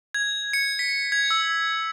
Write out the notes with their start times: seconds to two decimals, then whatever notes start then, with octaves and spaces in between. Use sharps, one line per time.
0.14 G#6
0.53 C#7
0.79 B6
1.12 G#6
1.31 E6